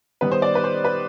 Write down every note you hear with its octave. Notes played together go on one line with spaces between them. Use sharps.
D#3 G3 B3 D#4 B4
C5
D5
B4
C5
B4